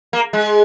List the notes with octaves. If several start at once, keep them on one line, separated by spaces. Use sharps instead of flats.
A#3
G#3